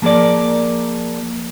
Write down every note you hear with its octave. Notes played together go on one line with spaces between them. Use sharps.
F3 A#3 G#4 A#4 D5